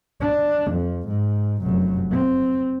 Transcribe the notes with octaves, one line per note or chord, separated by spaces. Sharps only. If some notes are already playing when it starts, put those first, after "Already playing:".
D4
F2
G#2
F1 F#2
C4